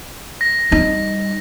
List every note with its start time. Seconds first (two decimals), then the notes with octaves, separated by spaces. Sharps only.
0.41 A#6
0.71 G3 D#4